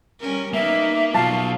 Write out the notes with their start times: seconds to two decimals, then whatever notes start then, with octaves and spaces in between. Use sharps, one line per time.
0.20 G3 C#4 A#4
0.54 A#3 B3 D#4 E5
1.14 B2 F#3 F4 F5 A5